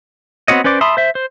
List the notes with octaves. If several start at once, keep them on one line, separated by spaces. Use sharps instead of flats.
B3 C4 F#4 C#5 D#5
C#4 B4 C5 D5 D6
E5 A5 B5 C6 D#6
C5 E5
C5